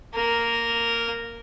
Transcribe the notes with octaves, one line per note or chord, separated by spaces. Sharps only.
A#3 A#4